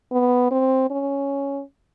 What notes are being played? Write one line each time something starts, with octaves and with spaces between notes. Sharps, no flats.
B3
C4
C#4